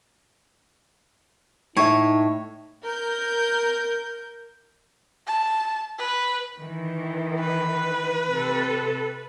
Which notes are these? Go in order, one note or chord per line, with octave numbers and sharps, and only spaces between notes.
A2 D#4 C#5 E5 C#6
A#4 G6
A5
B4
D#3 E3
B4
C3 A4